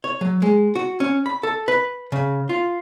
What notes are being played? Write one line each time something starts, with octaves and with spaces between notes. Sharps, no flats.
C#5
F#3
G#3
F#4
C#4
B5
A4
B4
C#3
F4